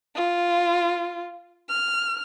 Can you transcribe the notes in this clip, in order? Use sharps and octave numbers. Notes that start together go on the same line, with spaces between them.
F4
F6